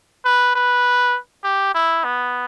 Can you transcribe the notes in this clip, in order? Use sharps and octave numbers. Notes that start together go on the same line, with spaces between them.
B4
B4
G4
E4
B3